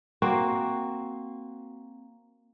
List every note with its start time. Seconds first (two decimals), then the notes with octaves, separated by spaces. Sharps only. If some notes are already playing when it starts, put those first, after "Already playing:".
0.22 A#3 C4 F#4